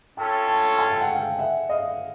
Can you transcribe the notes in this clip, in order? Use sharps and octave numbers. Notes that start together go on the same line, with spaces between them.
C#4 F4 A4 C#5 G5 A5
G5 A5
G#5
G5
F#5
F5 G5
E5 F#5
D#5 F5